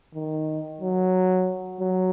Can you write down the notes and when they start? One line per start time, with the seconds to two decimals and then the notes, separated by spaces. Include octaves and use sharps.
0.15 D#3
0.81 F#3
1.80 F#3